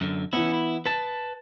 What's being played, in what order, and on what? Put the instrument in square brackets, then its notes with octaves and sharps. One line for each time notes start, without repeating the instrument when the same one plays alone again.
[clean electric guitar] F#2 D3
[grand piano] E3 B3 [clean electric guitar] C#4 E4
[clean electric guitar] E4
[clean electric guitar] B4 A5 [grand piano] A6